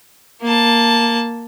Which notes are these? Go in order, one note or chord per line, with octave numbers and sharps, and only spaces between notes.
A#3 A5